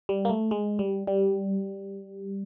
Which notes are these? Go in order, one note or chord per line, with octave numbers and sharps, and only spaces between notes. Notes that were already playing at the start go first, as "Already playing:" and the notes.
G3
A#3
A3
G#3
G3
G3